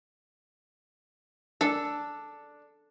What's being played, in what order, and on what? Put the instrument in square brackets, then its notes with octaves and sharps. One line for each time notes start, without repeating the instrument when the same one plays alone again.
[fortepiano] D4 [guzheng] A4